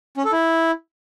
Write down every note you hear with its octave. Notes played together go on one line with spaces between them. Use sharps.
C#4
A4
E4